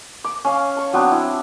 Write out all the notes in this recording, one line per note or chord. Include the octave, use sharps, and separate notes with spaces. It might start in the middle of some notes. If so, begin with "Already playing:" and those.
D6
C#4 F5
A5 C#6
F#3 B3 C4 D4
E4